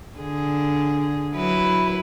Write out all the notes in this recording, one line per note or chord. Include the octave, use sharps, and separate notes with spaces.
D3 G#4
F#3 E4 B4